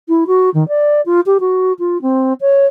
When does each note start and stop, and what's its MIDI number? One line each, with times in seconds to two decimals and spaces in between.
0.08 0.24 64
0.27 0.50 66
0.54 0.67 51
0.68 1.01 74
1.06 1.20 65
1.26 1.38 67
1.40 1.73 66
1.79 2.01 65
2.02 2.33 60
2.41 2.66 73